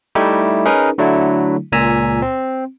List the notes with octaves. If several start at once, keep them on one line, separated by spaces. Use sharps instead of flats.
G3 A3 D#4 E4 G4
C#4 D#4 G#4 A#4 B4
D3 F#3 A3 D4 E4
C#2 A#2 G#5 A#5 E6 B6
C4